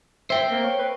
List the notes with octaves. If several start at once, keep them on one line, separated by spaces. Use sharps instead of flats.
C5 E5 G5
A#3
C#5
B4